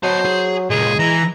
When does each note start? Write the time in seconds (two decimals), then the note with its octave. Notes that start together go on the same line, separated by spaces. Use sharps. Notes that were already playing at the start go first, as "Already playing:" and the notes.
0.03 F#3 C5 D#5 A5
0.25 G#4
0.70 C#2 A#2 G#3 G#4
0.99 E3 A#5